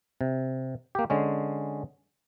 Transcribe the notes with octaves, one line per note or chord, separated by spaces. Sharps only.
C3
A#3 G4
D3 G#3 C#4